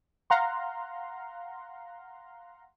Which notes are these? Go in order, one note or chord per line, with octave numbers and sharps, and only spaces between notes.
F5 F#5 A#5 C6